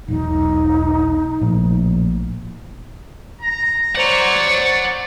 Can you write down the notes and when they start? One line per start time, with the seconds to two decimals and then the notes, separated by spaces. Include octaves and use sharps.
0.08 E1 B1 D#4
1.41 A#1 A2
3.41 A#5
3.96 C5 D5 F#5 A#5 C#6